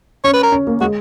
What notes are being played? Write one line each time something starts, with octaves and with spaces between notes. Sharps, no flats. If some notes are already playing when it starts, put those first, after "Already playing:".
C#4 C#5
B4
A#4
C#4
A#3
G#3 F#4